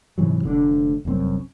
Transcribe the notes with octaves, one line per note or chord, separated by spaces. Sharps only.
G#2 C3 E3 F#3
F1 D3 D4
F1 C2 F#2 C4